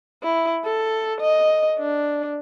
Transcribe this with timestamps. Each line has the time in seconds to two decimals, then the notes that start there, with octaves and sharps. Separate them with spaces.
0.23 E4
0.65 A4
1.21 D#5
1.79 D4